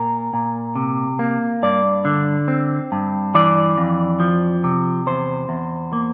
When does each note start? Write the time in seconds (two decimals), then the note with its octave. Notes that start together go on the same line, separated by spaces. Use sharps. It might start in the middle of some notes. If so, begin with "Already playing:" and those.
Already playing: A#2 A#4
0.33 A#2
0.75 C3
1.19 A#3
1.63 G2 D5
2.05 D3
2.48 C4
2.92 G2
3.34 E3 D5
3.77 F2
4.20 F3
4.64 C3
5.06 E2 C5
5.49 E2
5.93 A#3